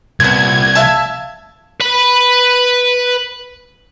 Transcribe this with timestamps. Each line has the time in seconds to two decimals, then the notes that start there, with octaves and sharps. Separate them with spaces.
0.20 C2 A#2 B3 G#6
0.75 E5 F5 A5
1.81 B4 B5